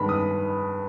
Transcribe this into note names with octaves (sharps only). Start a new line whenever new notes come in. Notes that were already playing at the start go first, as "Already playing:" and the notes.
Already playing: G2 D#3 G#3 B3 B5
D#6